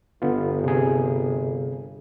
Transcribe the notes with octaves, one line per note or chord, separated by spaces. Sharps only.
G1 D3 B3 F4
C3 G#4